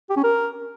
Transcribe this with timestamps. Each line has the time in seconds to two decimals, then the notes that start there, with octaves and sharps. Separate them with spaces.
0.10 G4
0.17 C#4
0.23 A#4